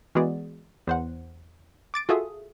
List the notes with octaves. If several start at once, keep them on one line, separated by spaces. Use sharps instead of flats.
E3 G#3 B3 F#4 G#4 D5
E2 C5 F#5
D6 A6 D7
F4 F#4 G#4 A4 E5 D#6